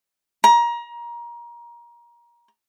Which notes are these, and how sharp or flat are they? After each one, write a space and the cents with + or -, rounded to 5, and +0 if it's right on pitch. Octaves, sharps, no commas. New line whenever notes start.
A#5 +25